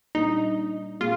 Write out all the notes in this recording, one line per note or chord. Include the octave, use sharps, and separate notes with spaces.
A#2 G3 D4 D#4
A#2 G#3 F4